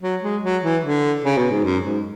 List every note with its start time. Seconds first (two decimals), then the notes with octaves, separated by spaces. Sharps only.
0.02 F#3
0.23 G#3
0.43 F#3
0.63 E3
0.83 D3
1.24 C#3
1.37 B2
1.51 G#2
1.64 F#2
1.85 G#2